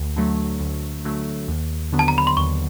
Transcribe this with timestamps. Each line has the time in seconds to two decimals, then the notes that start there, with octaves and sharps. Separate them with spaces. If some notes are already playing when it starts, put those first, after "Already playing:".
Already playing: D2
0.16 D3 F#3 A3
0.60 D2
1.05 D3 F#3 A3
1.48 D#2
1.92 D3 F#3 B3 D4
1.99 A5
2.08 A#5
2.18 B5
2.27 C6
2.37 D#2 C#6